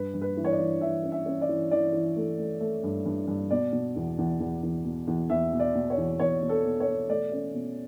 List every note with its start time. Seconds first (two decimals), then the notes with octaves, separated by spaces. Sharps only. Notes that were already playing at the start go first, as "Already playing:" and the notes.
Already playing: G2 B4
0.14 G2
0.21 B4
0.37 E3
0.44 C#5
0.52 D5
0.59 E3
0.81 E3 E5
1.03 C#4
1.12 E5
1.26 C#4
1.41 D5
1.49 E3
1.71 E3 D5
1.93 E3
2.16 A3
2.38 A3
2.60 A3
2.83 G2
3.06 G2
3.28 G2
3.50 B2 D5
3.72 B2
3.96 E2
4.18 E2
4.40 E2
4.63 E2
4.85 B2
5.07 E2
5.29 E2 E5
5.53 B2
5.60 D5
5.75 B2
5.90 C#5
5.97 E2
6.20 E2 C#5
6.42 B2
6.49 A4
6.65 B2
6.80 C#5
6.87 B2
7.09 A3 D5
7.32 C#4
7.54 B2